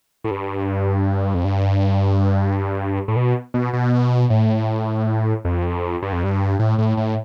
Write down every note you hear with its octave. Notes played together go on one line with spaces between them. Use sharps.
A2
G2
F2
G2
A2
B2
B2
B2
A2
F2
G2
F2
G2
A2
A2
A2